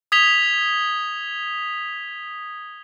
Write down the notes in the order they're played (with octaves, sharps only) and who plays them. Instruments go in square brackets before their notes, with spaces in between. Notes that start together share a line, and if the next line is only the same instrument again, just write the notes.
[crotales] D#6 G#6 B6 F7 G7